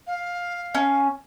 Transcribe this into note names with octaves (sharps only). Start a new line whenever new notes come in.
F5
C#4